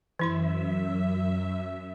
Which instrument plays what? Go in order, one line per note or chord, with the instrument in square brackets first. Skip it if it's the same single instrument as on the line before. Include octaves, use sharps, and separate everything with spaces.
[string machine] F#2 E5 [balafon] E3 E4 C6